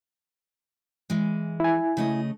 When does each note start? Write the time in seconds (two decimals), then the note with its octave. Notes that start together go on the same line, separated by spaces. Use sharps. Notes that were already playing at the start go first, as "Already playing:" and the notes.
1.10 E3 G#3
1.60 E4 G#5
1.97 C#3 A3 D#5